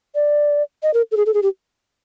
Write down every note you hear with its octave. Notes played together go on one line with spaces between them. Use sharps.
D5
D#5
A#4
A4
G#4
A4
G#4
G4